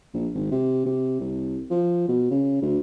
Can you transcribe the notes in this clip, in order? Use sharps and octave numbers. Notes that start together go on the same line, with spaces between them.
A#1
G#1
C3
C3
C2
F3
B2
C#3
D2